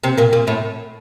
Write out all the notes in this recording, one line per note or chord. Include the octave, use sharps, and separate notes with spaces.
C3 C4
A#2 A#3
A#2 A#3
A2 A3